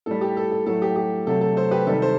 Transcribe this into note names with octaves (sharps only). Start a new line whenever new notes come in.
A2 G3 A4
G4
A4
A4
A2 F#3 A3 A4
G4
G4
C3 F#3 A3 A4
A4
A4 C5
G4 B4
C3 D#3 G3 A4
A4 C5